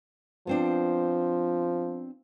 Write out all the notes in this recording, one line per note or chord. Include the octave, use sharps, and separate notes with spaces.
F3 B3 C4 D4